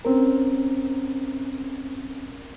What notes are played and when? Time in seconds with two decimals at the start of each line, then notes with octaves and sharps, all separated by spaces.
0.05 C4 C#4 A#4